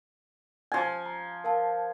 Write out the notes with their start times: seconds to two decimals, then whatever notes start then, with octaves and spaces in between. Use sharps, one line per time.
0.72 F3 G#5
1.06 A#5
1.44 A#4 F5 A5